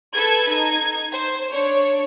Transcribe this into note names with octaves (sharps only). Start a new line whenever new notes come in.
A4 B4 G#6
D#4 G#6
C5
D4 C#5